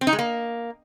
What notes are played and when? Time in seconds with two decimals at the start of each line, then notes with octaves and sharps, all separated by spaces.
0.01 C4
0.07 D#4
0.13 G#3
0.19 A#3